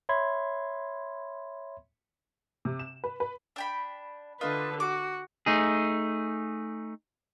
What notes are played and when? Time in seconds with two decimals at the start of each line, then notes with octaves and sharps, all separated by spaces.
0.09 C#5 E5 B5 C6 G#6
2.65 C3
2.79 E7
3.04 B4
3.20 B4
3.56 D4 G5 B5
4.41 D3 D4 F4 B4 D#5
4.80 F#4 D6
5.46 A3 D#4 G#4